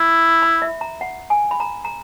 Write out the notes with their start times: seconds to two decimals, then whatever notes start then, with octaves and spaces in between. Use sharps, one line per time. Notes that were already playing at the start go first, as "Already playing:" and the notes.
Already playing: E4
0.42 B5
0.62 E5
0.81 A#5
1.01 F#5
1.30 G#5
1.51 B5
1.60 A#5
1.85 A#5